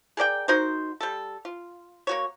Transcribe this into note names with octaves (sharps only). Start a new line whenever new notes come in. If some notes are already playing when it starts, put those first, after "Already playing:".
G#4 A#4 D5 G5
D#4 F#4 A#4 C5
G3 A4
F4
A#3 F#4 C#5